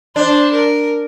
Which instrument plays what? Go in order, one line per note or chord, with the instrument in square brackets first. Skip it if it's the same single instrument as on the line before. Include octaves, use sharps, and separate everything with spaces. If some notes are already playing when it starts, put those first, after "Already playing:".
[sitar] D4 [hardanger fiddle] C5
[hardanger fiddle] A#4